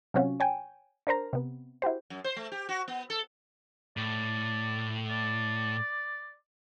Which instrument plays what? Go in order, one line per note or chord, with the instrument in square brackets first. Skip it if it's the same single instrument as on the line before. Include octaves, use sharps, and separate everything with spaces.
[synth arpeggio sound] C3 F#3 C4 C#4 F4 F#4
C#5 G5 G#5
D4 A#4 C5 A#5
C3 B3
E4 F#4 G4 C5
[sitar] F#2
C5
A3
G4
F#4
B3
A4
[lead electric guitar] A2 [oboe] D5
[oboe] D5